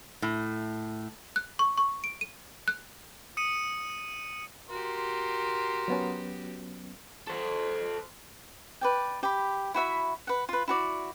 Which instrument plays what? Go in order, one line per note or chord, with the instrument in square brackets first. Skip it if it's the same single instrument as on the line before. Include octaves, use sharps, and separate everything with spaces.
[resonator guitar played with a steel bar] A2
[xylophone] F#6
C#6
C#6
D7
D#7
F#6
[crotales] D#6 C#7 D#7
[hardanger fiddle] F#4 G4 [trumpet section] A#4 C6
[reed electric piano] F#3 B3 C#4
[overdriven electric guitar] A4 C5
[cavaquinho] B4 D5 G5
G4 B5
E4 F#4 E5 B5
B4 F#5
F4 B4
E4 F#4 D5